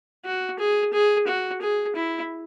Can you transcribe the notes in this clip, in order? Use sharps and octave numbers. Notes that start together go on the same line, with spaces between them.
F#4
G#4
G#4
F#4
G#4
E4